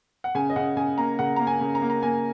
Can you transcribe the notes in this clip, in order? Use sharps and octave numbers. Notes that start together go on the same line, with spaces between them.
F#5
C#3 G#5
D#5
C#3 F#5
C#3 G#5
A#3 A#5
C#3 F#5
A#3 A#5
G#5
C#3
A#5
A#3
A#5
A#3 G#5